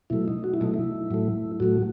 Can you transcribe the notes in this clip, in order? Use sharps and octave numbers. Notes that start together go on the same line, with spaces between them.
B2 F#3 A3 E4
D#4
F#4
E4
B2 F#3 A3 D#4
E4
A2 F#3 A3
A2 F#3 A3 F#4